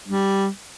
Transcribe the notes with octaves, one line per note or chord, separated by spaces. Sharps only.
G3